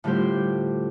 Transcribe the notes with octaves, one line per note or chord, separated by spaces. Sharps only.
A2 D3 G3 F4 G4 C5